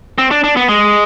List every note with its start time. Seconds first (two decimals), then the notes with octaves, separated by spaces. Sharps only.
0.18 C4
0.31 D4
0.44 D4
0.57 B3
0.68 G#3